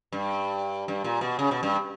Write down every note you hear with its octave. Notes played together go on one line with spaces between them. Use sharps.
G2
G2
A#2
B2
C#3
B2
G2